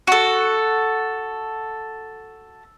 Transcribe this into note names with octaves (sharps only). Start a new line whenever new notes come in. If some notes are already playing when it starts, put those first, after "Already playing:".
F#4 A4